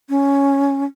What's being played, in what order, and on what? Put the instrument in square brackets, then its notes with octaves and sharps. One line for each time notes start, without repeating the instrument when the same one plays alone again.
[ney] C#4